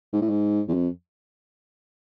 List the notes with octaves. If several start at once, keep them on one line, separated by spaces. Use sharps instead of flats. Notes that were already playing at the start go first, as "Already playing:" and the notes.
G#2
A2
G#2
E2
F2